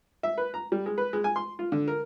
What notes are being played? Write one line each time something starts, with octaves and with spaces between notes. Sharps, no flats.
E5
B4
A#5
G3
G#3
B4
G#3
G#5
C6
F4
D3
A#4